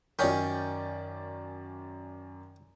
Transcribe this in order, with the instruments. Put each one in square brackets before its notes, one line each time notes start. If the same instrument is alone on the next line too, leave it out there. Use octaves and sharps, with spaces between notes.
[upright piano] F#2 D5 G6 [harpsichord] D#3 C#4